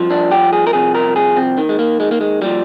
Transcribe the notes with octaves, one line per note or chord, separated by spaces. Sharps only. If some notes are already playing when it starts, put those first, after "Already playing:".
Already playing: G2 F3
D4
G4
G#4
A#4
C2 C3 F3 G#4
A#4
G#4
C4
D#2 D#3
G#3
A#3
G#3
A#3
G#3
A#2 F3 G3